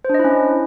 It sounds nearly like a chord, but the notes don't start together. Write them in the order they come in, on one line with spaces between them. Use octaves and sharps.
C5 D4 D#5 E4 C#4